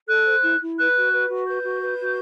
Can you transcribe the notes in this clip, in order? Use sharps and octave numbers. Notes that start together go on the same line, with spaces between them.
A4 F#6
C5
E4
E4
B4 F#6
F#4
B4
F#4
B4 G6
F#4
B4
F#4